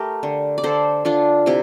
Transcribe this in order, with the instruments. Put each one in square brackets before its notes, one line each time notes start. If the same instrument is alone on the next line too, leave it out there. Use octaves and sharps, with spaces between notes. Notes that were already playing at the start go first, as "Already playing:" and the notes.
Already playing: [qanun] A3 G4 A#4
D3
D5
D3 A4 C5
D3 D4 F4
C3 E4 G4